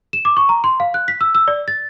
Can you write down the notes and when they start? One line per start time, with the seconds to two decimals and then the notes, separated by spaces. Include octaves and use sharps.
0.13 E7
0.25 D6
0.37 C#6
0.49 A#5
0.64 C6
0.80 F5
0.94 F#6
1.08 B6
1.21 E6
1.35 E6
1.48 D5
1.68 A6